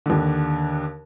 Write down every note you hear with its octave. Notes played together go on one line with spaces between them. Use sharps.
D#2 D3